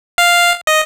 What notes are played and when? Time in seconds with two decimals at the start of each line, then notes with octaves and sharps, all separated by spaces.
0.18 F5
0.67 D#5